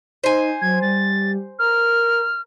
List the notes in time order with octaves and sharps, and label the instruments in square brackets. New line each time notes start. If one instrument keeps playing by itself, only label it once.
[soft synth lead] D#4 [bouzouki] C5 G#5
[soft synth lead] F#3 [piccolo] G#6
[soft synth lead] G3 [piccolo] A6
[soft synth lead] A#4 [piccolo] F6